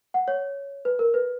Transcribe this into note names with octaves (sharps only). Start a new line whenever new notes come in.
F#5
C#5
B4
A#4
B4